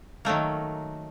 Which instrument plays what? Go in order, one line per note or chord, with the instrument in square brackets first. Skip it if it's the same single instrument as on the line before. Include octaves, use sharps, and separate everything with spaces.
[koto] D#3 F#3 A3 A#3